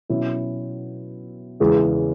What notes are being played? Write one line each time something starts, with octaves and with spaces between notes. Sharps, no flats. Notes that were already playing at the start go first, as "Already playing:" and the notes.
B2 F#3 C#4 E4
E2 C#3 E3 G#3